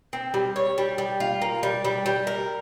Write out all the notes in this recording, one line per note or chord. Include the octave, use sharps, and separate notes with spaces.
C4
G3
C#5
G3
G3
F4
A#3
G3
G3
G3
A#4